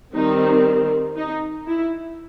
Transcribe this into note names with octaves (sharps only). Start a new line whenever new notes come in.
D#3 G3 C4 D#4
D#4
E4